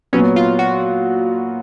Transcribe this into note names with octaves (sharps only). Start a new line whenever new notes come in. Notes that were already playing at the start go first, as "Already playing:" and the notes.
A#2 F#3 B3 C#4
F4
F#4